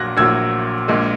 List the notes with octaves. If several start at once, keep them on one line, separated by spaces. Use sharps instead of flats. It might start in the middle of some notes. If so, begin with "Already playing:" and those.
Already playing: A#1 A#2 F#3 F#6 G#6 A#6
A#1 A#2 F#3 E6 G#6
A#1 A#2 G#3